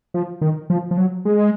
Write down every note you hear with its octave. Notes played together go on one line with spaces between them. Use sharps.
F3
D#3
F3
F3
F#3
G#3